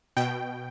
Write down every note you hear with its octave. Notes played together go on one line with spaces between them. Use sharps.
B2 G5